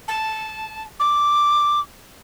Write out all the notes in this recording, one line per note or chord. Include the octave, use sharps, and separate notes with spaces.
A5
D6